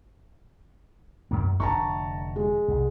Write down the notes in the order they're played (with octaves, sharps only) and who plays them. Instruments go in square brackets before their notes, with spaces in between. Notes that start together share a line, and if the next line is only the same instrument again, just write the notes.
[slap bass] F#2 A#3
[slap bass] F1 D3 D4 [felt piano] A5 A#5 C#6
[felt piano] G#3
[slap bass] C2